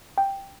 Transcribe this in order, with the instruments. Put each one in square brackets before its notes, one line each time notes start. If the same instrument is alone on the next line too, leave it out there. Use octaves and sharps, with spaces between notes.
[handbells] G5